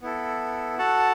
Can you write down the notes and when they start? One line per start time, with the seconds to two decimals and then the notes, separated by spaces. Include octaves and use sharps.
0.02 B3 E4 A4
0.78 F#4 A4 F#5 A5